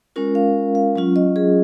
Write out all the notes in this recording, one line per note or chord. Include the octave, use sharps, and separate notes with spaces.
G#3 C#4 F4 A#4
F5
F5
F#3 C#4 F4
D#5
G#4